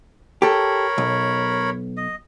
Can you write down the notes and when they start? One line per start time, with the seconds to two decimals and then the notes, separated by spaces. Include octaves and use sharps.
0.42 G4 A4 A#4 C#5 B5
0.98 B1
1.97 D#5